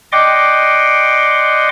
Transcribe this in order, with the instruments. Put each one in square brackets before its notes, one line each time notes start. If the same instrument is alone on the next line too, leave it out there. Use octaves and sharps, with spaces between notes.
[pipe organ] D5 D#5 F#5 G5 C6 D6